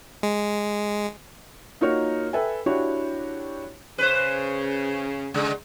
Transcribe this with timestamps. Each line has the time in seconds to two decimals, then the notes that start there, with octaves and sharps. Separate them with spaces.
0.23 G#3
1.81 A#3 D#4 F4 F#4 A#4 C#5
2.33 A4 B4 E5 G5 G#5
2.66 D4 E4 F#4 G4 C#5
3.98 C#3 B4 C5
5.34 C#3 G#3